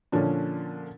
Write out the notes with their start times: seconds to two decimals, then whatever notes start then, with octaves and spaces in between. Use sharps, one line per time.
0.12 A#2 D3 F3 C#4 D4